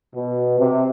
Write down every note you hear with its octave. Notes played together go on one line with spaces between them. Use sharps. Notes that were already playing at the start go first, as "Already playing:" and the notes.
B2
C3